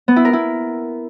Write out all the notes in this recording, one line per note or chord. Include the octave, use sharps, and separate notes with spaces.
B3
E4
A#4
E4